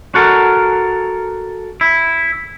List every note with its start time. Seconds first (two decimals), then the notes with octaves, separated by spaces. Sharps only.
0.15 F#4 A4 A#4
1.81 E4